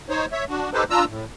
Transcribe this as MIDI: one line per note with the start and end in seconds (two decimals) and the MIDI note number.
0.09 0.25 63
0.09 0.25 72
0.09 0.25 73
0.32 0.45 73
0.32 0.45 76
0.49 0.70 62
0.49 0.70 66
0.73 0.84 63
0.73 0.84 67
0.73 0.84 69
0.73 0.84 71
0.73 0.84 72
0.90 1.05 62
0.90 1.05 65
0.90 1.05 82
0.90 1.05 88
1.09 1.25 45